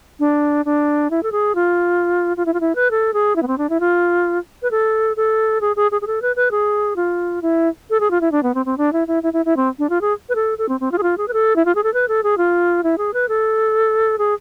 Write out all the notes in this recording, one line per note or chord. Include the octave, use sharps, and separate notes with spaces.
D4
D4
E4
A4
G#4
F4
F4
E4
F4
E4
B4
A4
G#4
E4
B3
C4
D4
E4
F4
B4
A4
A4
G#4
G#4
G#4
G#4
A4
B4
B4
G#4
F4
E4
A4
G#4
F4
E4
D4
B3
C4
C4
D4
E4
E4
E4
E4
E4
C4
D4
F4
G#4
B4
A4
A4
C4
C4
F4
G#4
F4
G#4
B4
A4
E4
F4
G#4
A4
B4
A4
G#4
F4
E4
G#4
B4
A4
G#4